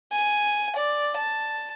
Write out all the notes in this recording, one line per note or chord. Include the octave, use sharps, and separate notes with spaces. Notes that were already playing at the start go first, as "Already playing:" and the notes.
G#5
D5
A5